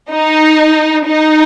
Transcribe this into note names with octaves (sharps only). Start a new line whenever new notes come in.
D#4
D#4